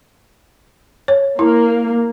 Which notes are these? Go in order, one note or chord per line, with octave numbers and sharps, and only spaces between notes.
C#5
A#3 E4